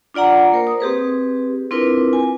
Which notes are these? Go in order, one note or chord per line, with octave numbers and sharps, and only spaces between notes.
D4 F4 D5 F#5 A#5
A#3 A#4 C5
D#6
C4 G4 G#4 B4
C4 D4 E4 F4 A#4 B4
G#5